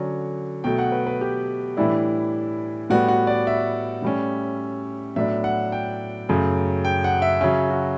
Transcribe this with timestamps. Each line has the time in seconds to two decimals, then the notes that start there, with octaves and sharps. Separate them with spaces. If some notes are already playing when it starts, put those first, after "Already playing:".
Already playing: D3 F#3 C#4
0.64 B2 F#3 A3 G5
0.78 F#5
0.92 B4
1.07 B4
1.21 G4
1.77 A2 E3 G3 D4 E4
2.90 A2 G3 B3 F#4
3.08 F#4
3.27 D5
3.47 E5
4.02 A2 G3 C#4
5.16 A2 F#3 B3 D4 E5
5.44 F#5
5.72 G5
6.29 F#2 C#3 F#3 A3
6.85 G5
7.04 F#5
7.22 E5
7.41 C#3 F#3 C#4 E5
7.70 F#4